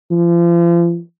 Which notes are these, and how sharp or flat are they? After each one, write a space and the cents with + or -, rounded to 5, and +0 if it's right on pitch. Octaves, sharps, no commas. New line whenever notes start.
F3 -35